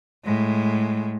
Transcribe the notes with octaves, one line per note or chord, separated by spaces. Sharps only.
A2 G#3